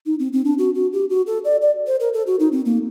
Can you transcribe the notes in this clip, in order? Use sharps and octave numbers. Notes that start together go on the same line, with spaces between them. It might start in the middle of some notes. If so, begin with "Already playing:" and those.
D#4
C4
C4
D4
F#4
F#4
G4
F#4
A4
D5
D5
C5
A#4
A4
F#4
D#4
C4
A#3